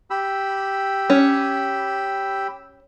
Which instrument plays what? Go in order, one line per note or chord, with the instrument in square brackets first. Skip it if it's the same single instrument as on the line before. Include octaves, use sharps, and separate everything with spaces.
[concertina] G4 B5 E6
[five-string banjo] C#4